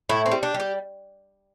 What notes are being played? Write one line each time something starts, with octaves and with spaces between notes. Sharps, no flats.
A2 E4
C4
G3
D4
G3
G4